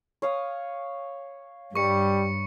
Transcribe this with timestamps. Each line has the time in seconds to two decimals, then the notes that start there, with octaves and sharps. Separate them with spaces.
0.22 C#5 F5 D#6
1.75 G2 G3 B4 C#6 C#7